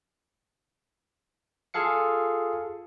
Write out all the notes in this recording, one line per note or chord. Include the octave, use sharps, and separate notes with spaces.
F4 G#4 A4 F5 C#7